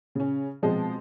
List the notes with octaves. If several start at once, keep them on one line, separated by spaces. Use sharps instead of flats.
C#3 C#4
B2 F3 G#3 C4